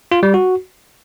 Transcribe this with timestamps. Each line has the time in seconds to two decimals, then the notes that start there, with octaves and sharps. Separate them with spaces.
0.12 F4
0.23 G3
0.34 F#4